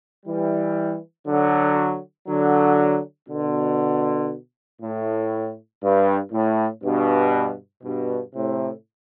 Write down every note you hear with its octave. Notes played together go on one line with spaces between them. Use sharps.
E3 G3
D3 F#3
D3 F#3
B2 D3
A2
G2
A2
G2 B2
G2 B2
A2 C3